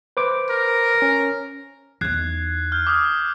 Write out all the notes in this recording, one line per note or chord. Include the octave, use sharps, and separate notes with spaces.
B4 C5 D6
A#4
C#4
E2 D#4 F#6 G#6 C7
F6 G6
D6 D#6 F6